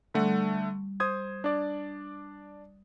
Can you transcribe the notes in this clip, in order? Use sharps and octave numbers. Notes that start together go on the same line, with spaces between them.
D3 G3 A3 F#5
C5 D#6 G#6
D4 D5